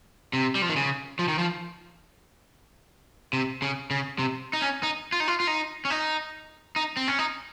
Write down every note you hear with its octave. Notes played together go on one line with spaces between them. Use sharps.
C3
G3
F3
D#3
C#3
F3
D#3
F3
C3
C#3
C#3
C3
D#4
C#4
D#4
F4
D#4
F4
F4
D#4
C#4
D#4
D#4
C4
C#4
D#4